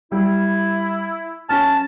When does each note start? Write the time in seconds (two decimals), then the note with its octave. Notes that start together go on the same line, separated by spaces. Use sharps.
0.12 G3 E4
1.49 C#4 A5 F6